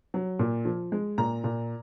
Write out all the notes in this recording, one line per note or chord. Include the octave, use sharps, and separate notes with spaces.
F#3
A#2
F3
G#3
A#2 A#5
A#2